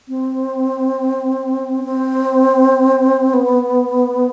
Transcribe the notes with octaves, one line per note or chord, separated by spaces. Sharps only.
C4
C4
B3